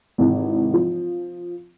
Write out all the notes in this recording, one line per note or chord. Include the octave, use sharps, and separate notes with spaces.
G#1 C3 E3
F3